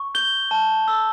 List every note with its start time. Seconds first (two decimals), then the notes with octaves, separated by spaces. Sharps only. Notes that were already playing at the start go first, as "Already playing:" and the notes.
Already playing: C#6
0.15 G6 G7
0.51 A5
0.88 E6